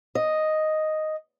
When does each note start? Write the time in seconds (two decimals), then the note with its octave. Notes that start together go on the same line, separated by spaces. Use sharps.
0.15 D#5